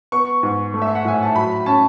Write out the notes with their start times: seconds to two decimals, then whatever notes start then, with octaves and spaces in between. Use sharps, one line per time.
0.12 B3 C#6
0.43 G#2
0.74 A3
0.82 E5
0.95 F#5
1.05 A2 G#5
1.22 A5
1.35 F#3 B5
1.66 C#4 A5